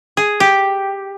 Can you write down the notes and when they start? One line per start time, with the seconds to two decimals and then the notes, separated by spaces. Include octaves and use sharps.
0.17 G#4
0.40 G4